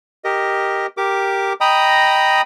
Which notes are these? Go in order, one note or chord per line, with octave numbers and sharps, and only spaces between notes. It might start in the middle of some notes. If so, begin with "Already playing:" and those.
G4 A#4 D#5
G4 A#4 D6
D#5 G5 A#5 B5 D#6